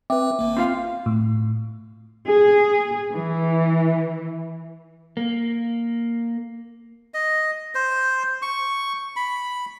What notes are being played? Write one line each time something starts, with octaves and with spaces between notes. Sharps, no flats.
C4 B4 E5 G5 D6
G#1 A#3
C4 F4 F5
A2
G#4
E3
A#3
D#5
C5
C#6
B5